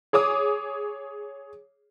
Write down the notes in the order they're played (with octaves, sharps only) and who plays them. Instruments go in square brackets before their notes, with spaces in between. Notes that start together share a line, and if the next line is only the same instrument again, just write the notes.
[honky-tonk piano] G#4 C#5 D6 D#6